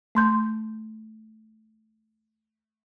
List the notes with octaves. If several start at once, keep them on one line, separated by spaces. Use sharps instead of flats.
A3 C6 G6